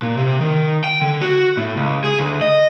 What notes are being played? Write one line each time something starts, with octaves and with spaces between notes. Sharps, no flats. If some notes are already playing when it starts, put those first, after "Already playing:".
A#2
C3
D#3
G5
D3
F#4
A2
C#2
G#4
D2
D#5